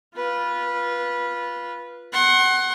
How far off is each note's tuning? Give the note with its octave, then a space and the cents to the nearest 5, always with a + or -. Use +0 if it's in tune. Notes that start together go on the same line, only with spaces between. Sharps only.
F4 +0 B4 -15
F#5 +15 C6 +40